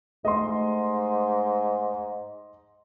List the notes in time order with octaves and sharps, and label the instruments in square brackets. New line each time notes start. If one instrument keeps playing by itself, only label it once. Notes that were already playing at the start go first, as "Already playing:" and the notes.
[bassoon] G#2 [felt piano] A3 [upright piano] D#5 C6